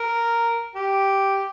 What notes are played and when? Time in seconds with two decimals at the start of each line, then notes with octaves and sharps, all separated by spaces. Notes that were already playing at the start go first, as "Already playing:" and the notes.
Already playing: A#4
0.75 G4